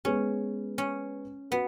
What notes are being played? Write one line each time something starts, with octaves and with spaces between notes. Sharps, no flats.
G#3 B3 C#4 G#4 B4
C#4
B3 F#4 B4